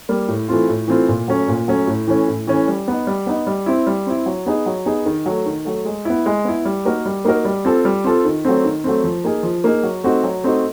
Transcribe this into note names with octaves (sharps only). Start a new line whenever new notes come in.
G3 A#3
A2
E3 A3 C4 F4
A2
E3 A3 C4 F4
A#2
F#3 A3 C#4
A#2
F#3 A3 C#4
A2
E3 A3 C#4
A2
E3 A3 C#4
G3
B3 D#4
G3
B3 D#4
G3
C4 E4
G3
C4 E4
F#3
B3 D#4 G#4
F#3
B3 D#4 G#4
D#3
F#3 A3
D#3
F#3 A3
G#3
B3 E4
G#3
B3 E4
G3
A#3 D#4 F#4 A#4
G3
A#3 D#4 F#4 A#4
G3
C4 F4 A4
G3
C4 F4 A4
D#3
F#3 A3 C4
D#3
F#3 A3 C4
F3
A#3 D#4 G#4
F3
A#3 D#4 G#4
F#3
A3 C4 D#4 F#4
F#3
A3 C4 D#4 F#4